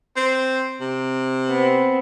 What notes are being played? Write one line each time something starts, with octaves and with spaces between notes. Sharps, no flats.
C4
C3
B3 C4